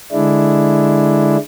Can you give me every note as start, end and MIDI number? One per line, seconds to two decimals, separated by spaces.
0.12 1.37 50
0.12 1.37 56
0.12 1.37 62
0.12 1.37 64